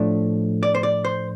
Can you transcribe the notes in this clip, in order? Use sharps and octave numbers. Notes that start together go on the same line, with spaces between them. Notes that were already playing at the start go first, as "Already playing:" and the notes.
Already playing: A2 F3 A3 D4
D5
C5
D5
C5